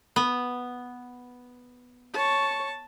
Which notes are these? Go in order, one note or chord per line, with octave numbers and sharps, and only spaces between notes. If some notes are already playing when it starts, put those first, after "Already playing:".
B3
C#5 A5 C#6